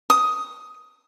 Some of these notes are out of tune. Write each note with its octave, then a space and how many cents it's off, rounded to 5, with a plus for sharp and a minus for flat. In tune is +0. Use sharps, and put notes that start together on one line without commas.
D#6 +10